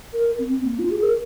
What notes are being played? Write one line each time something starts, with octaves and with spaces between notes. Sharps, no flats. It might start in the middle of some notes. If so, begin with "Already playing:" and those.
A#4
C4
C4
A#3
F4
G#4
A#4